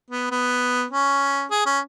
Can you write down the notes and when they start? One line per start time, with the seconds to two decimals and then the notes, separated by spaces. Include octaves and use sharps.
0.10 B3
0.31 B3
0.91 C#4
1.51 G#4
1.66 C#4